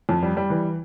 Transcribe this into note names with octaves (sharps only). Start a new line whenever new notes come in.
F2
G3
G3
E3